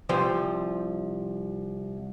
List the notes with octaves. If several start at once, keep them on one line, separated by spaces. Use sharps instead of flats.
C2 F3 C5